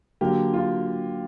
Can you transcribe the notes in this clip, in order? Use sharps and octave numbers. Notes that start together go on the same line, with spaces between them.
D3 F#3 A#3 G4
F4